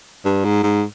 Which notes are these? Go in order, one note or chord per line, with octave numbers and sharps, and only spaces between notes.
G2
G#2
G#2